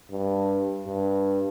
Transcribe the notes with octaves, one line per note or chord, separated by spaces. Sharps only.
G2
G2